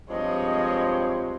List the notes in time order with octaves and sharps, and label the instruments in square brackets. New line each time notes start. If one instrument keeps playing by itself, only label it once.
[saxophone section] G2 F3 C4 [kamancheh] G#3 C#5 [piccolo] D#5